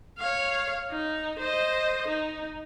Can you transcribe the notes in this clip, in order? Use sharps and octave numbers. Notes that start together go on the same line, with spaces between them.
C#5 F5
D#4
C5 D#5
D#4